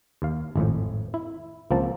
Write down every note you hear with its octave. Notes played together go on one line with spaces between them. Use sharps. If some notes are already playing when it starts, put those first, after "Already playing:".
D#2 F5
G#1 F2 A2
E4
C#2 F3 A#3 C4 A5